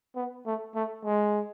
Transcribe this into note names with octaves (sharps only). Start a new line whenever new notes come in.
B3
A3
A3
G#3